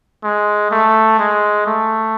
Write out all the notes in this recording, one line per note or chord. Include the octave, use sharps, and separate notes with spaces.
G#3
A3
G#3
A3